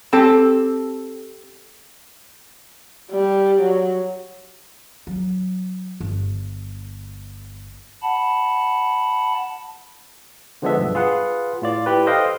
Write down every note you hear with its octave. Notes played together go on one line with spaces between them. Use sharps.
C4 G4 A4 A5
G3
F#3
F#3
G1
F#5 A5 B5
D3 F3 G#3 B3 D4 E5
B1 G2
F4 G#4 B4 F#5
A2 F4 D5
E4 G4 B4
A4 C5 D#5 F5 G5